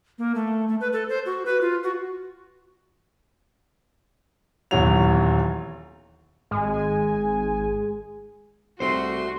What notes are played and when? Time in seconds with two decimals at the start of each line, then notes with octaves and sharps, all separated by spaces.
0.19 A#3
0.35 A3
0.68 A3
0.80 B4
0.93 A4
1.09 C5
1.26 F#4
1.46 B4
1.61 F4
1.83 F#4
4.71 D#1 E2 E3 F#3 F#4 F7
6.51 G#1 G#3 G#5
8.80 C2 A3 F#4 C5 C6